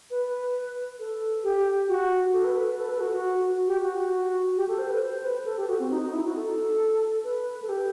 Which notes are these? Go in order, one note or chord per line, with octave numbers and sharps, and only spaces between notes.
B4
A4
G4
F#4
A4
B4
B4
B4
A4
B4
F#4
F#4
G4
F#4
F#4
G4
A4
C5
B4
C5
B4
A4
G4
F#4
C4
D#4
D#4
E4
F#4
A4
B4
A4
G4